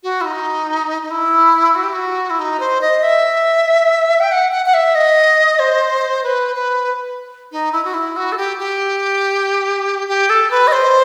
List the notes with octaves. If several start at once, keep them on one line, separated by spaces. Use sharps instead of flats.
F#4
E4
D#4
D#4
E4
F#4
G4
F#4
E4
D#4
C5
D#5
E5
G5
F#5
F#5
F#5
E5
D#5
C5
B4
B4
D#4
E4
F#4
E4
F#4
A4
G4
G4
G4
A4
B4
D#5
C5